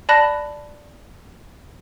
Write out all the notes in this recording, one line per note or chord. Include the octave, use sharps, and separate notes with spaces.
D5 A5 B5 F#6 A#6